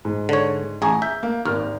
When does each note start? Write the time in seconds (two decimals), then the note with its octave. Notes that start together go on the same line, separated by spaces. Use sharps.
0.05 G#2
0.29 D3 C#5
0.82 A1 G#4 G#5 A#5 C#6
1.02 E5 G6
1.23 A#3
1.46 G#1 D#2 A#4 F6